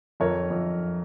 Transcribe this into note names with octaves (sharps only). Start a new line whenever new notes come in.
F2 A#4 C#5
F2